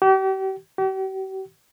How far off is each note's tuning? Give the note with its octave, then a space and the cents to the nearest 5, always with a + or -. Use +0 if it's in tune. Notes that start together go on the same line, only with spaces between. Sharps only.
G4 -40
G4 -45